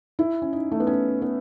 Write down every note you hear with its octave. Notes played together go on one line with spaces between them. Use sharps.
E4
C#4
D#4
A3
B3
C#4
B3